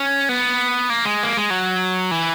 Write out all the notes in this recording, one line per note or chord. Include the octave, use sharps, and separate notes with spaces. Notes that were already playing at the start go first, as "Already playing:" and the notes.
Already playing: C#4
B3
A#3
G#3
A#3
G#3
F#3
E3